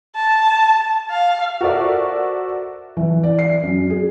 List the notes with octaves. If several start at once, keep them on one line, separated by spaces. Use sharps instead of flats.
A5
F5
F#4 A4 A#4 C5 D5 E5
E3
D5
C7
F#2
G#4